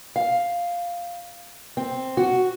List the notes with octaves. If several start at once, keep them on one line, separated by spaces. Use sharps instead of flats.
F5
C4
F#4